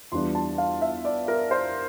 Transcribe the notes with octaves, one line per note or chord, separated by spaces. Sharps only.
E2 E3 G3 D4 F4 C6
A5
F5
E5
D5
A#4
C5